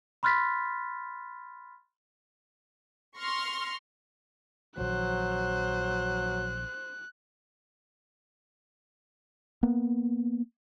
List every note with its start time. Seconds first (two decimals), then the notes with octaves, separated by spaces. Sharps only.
0.23 B5 C6 F6 F#6 A6 B6
3.17 C6 C#6 F6 A#6
4.78 A#1 D#3 F3 F#3 C5 F#6
9.63 A#3 B3